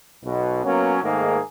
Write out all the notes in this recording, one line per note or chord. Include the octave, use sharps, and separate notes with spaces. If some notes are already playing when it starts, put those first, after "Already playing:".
B1 B2
F#3 A#3 B3 C#4
G#2 D#3 A3 A#3 G#4